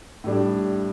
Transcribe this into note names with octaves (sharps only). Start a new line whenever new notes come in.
A2 G3 D4